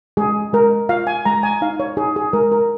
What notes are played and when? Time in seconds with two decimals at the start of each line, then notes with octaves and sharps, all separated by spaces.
0.17 G#3 G#4
0.53 G#3 A#4
0.89 F4 F5
1.07 G#5
1.25 G#3 A#5
1.43 G#5
1.62 D#4 F5
1.80 C#5
1.97 D#4 G#4
2.16 G#4
2.33 G#3 A#4
2.52 A#4